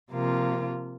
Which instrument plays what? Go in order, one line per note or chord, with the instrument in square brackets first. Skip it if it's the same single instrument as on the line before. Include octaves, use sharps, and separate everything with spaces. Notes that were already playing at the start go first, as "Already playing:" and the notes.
[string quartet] C3 F3 A#3 F4